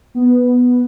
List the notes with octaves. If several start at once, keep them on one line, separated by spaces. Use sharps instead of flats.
B3